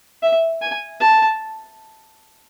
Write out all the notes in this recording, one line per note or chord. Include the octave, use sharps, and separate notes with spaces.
E5
G#5
A5